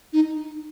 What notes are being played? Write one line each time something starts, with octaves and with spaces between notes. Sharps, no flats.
D#4